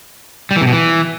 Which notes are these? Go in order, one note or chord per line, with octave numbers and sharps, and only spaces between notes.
G3
E3
C3
B2
E3